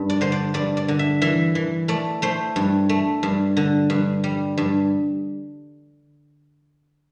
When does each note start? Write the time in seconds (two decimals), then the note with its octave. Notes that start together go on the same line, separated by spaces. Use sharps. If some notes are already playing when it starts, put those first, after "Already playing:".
Already playing: G2
0.10 D5
0.21 D3 C5
0.32 D5
0.54 G2 D5
0.77 D5
0.88 D3
0.99 E5
1.22 E3 E5
1.55 E3
1.88 A3 D5
2.22 A3 C5
2.56 G2
2.89 A3
3.23 G2
3.57 D3
3.90 G2
4.24 G3
4.58 G2